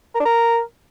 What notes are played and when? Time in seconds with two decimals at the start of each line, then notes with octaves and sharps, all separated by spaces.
0.14 A#4
0.20 D4
0.25 A#4